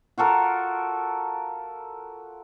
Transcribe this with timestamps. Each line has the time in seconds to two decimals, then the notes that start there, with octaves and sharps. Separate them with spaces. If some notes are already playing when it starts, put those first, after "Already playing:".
0.18 F4 F#4 A4 A#4